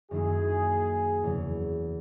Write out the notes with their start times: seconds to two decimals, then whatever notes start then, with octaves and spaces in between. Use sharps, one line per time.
0.11 F#2 D#3 A#3 E4 G#4
1.23 E2 C#3 F#3